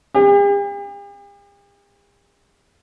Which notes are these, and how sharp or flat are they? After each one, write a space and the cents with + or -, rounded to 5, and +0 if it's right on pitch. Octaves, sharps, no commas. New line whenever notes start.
G4 +45